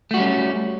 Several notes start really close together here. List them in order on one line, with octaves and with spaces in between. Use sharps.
A3 F#4 G3 C#4